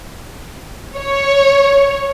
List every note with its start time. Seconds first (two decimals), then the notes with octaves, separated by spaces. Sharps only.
0.96 C#5